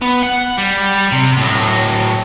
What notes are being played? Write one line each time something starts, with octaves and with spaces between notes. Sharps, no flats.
B3
F#5
G3
C3
A2 F#3